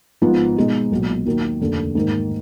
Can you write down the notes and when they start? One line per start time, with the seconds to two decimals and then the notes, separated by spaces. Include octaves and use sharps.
0.22 G#1 G#2 F3 B3 F4
0.57 B2 G#3 D#4
0.92 B1 A#2 F#3
1.25 D#2 D#3 F#3 A#3
1.61 F1 D#2 D3
1.95 G#2 D#3 A#3